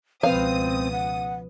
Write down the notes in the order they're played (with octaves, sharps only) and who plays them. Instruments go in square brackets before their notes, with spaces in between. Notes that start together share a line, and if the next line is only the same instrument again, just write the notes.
[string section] C#2 B2 D#6 [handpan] F3 B4 [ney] C4 [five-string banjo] F5
[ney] F#5